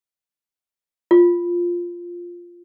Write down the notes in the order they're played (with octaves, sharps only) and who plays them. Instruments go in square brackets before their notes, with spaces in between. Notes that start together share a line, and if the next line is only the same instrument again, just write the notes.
[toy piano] F4